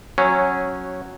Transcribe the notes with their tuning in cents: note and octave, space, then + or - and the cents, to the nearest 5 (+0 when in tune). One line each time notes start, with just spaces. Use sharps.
F#3 +0 C#4 -10